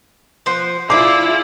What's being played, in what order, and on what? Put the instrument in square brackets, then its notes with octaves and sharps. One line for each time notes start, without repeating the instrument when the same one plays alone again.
[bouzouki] F3 C5 F#5
[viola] E4 F4 [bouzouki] G#4 D5 [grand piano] D6